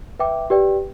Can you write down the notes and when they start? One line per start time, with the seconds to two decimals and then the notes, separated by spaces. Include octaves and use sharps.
0.19 B4 E5 G5 D6
0.50 G4 B4 D5 G5